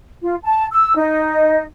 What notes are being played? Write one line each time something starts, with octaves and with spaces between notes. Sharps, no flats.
F4
A5
E6
D#4